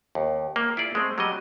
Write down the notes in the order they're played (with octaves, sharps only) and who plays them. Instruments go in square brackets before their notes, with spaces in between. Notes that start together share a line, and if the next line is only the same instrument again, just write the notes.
[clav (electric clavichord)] D#2
A#3
E4 F4 G#4 D5
G#3 A3 C4
F#3 G3 D#5